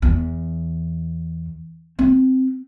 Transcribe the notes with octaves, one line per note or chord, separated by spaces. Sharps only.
E2
C4